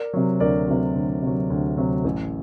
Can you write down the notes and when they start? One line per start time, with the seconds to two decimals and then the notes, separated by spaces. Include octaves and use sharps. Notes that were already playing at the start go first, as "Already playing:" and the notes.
Already playing: A#4 D5
0.13 C3 F#3
0.40 D2 A#4 D5
0.68 C3 F#3
0.95 D2
1.22 C3 F#3
1.50 D2
1.77 C3 F#3
2.05 A1